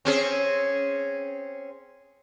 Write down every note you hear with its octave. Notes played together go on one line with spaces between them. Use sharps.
C4 C#4 G#4